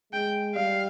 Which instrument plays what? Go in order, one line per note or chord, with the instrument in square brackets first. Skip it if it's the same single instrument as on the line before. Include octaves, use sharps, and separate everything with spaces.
[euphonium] G#3 [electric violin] G5
[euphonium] G3 [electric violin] F5